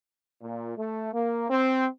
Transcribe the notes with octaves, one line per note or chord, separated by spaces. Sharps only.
A#2
A3
A#3
C4